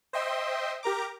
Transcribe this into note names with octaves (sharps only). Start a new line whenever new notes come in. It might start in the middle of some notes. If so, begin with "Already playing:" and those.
C5 D#5 E5 G5 C6
G4 A#4 A#5 D6